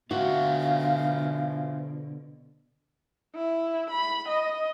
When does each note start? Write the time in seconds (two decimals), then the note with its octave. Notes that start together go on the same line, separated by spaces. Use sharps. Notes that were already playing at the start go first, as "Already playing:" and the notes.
0.11 B2 D3 F4 F#4 C5 E5 F5
3.35 E4
3.90 B5
4.29 D#5